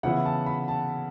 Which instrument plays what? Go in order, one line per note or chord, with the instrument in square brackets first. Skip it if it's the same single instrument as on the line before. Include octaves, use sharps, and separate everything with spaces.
[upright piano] C#3 E3 B3 E4 F#5
A5
B5
A5